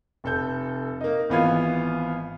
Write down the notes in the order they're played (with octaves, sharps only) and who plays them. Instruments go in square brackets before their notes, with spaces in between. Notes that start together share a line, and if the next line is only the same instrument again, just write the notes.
[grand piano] F1 A4 G6
A#3 D#4
G#1 E3 B3 F4 F5 G#6